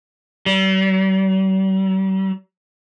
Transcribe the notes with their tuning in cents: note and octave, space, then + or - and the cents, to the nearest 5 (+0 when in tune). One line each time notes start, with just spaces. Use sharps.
G3 -45